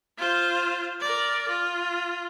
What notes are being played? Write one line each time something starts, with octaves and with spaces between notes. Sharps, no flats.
F4 C5
A#4 D5
F4